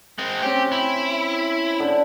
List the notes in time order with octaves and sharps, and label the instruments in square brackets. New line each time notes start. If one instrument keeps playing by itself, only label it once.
[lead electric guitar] G#3 C4
[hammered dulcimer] C4 C#4 [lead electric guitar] G4
[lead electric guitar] E4
[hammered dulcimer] D3